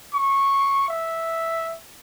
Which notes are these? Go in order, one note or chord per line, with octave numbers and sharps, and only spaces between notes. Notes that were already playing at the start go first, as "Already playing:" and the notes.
C#6
E5